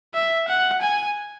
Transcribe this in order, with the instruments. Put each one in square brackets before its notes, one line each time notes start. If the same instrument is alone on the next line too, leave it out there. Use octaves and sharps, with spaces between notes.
[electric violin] E5
F#5
G#5